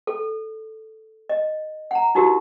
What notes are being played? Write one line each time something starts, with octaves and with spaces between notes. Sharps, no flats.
A4
D#5
F#5 A#5
D#4 E4 F#4 G4 A#4